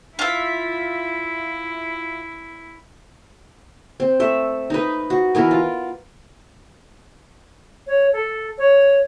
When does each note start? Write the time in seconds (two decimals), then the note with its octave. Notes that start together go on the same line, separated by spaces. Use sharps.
0.19 E4 F4 E5
4.00 C4
4.20 A3 E5
4.70 D#4 B4
5.10 F#4
5.35 E3 B3 A#4
5.51 F4
7.87 C#5
8.13 A4
8.58 C#5